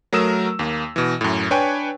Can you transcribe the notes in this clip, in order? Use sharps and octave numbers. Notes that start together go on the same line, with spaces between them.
F#3 A3 A#4 D#6 E6 E7
D#2 A#3
B2 E3
F#2 A2
D4 B4 C#5 G5 G#5 C#6